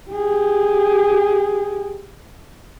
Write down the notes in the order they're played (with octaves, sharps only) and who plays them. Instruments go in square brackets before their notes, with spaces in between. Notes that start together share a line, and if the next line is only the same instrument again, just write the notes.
[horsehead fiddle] G4 G#4